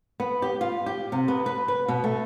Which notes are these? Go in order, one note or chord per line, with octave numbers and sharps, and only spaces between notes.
B3
G4
F4
G4
C3
B3
B4
B4
B2
A3